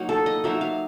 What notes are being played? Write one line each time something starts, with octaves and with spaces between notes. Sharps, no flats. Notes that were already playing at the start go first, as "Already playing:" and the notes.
Already playing: F#3 A#3 D#4
A4
D#5
F#3 A#3 D#4 E5
F5